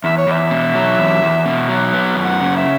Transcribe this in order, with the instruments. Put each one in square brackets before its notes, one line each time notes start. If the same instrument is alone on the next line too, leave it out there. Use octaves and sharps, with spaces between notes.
[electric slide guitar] E2 [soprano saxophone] E5
[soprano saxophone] C#5
[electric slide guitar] E2 [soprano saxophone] E5
[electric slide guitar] B2
F#3
E2
E2
B2
F#3
B3
F#2
[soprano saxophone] F#5
[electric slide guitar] C#3
[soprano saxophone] E5